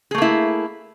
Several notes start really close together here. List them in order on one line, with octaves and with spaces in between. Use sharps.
G#4 A3 A#3 E4